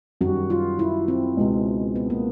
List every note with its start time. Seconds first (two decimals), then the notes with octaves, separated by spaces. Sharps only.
0.21 F#2 D#3 G3 F#4
0.50 F4
0.79 E4
1.08 C4
1.37 C#2 B2 G#3
1.96 B3
2.10 A#3